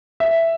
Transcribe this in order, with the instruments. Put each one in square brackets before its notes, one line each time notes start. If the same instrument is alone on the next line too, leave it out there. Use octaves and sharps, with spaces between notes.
[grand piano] E5